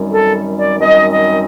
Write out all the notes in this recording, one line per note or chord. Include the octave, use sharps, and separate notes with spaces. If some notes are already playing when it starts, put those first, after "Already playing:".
Already playing: F#2 D#3 G3 C4
A4
D5
F#2 D#3 G3 C4 D#5
D#5